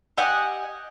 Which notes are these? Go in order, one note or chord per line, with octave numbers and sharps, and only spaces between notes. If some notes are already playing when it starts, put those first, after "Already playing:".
G4 D#5 F#5 G#5